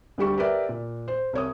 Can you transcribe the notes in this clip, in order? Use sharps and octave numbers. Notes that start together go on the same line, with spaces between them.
D2 G3 G4 C#6
G4 A#4 B4 D5 E5
A#2
C5
C2 C#5 D#6